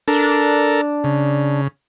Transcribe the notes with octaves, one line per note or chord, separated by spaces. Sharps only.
D4 A4 A#4
C#3